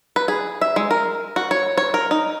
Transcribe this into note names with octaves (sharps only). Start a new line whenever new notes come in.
B4
G#4
E5
G#3
A#4
F#4
C#5
C#5
A#4
D#4